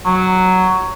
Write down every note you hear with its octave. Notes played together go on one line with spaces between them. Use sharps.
F#3